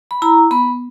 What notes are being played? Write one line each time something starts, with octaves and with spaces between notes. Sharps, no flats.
B5
E4 A#5
B3 B5